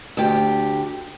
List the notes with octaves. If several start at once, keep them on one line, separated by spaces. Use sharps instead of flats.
D2 G4